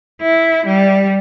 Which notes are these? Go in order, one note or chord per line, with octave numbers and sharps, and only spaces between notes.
E4
G3